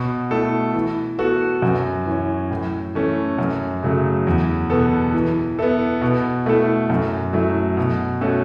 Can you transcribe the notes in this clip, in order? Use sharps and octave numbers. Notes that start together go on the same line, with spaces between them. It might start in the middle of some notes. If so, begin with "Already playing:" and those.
Already playing: B2
A3 E4 A4
E3
B3 F#4 A4
F#2
E3 C#4
A2
E3 A3 C#4 A4
F#2
C#3 F#3 A3
E2
B2 B3 A4
E3
B3 E4 A4
B2
A3 E4 A4
F#2
F#3 A3 E4
B2
A3 C#4 F#4 A4